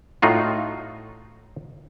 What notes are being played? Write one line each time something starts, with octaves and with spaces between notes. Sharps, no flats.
A2 D#4 F4 F#4